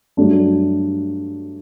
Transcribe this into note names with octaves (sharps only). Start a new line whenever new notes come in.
G2 F#3 A3 D4